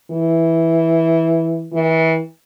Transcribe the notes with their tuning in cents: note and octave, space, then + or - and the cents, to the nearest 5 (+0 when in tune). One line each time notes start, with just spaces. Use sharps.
E3 -5
E3 -30